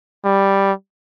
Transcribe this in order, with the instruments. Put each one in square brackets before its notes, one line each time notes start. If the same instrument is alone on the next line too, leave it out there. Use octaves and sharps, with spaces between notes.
[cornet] G3